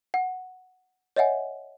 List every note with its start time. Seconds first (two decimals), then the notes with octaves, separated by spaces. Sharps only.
0.14 F#5
1.16 C#5 D#5 E5 F#5 G#5